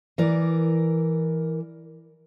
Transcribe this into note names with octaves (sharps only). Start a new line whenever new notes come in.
E3 A#4 D5